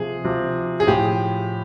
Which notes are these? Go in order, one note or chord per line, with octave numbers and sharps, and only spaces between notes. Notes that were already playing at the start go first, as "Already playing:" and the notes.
Already playing: C3 F3 G#4
C3 F3
G#4
A2 F3 G4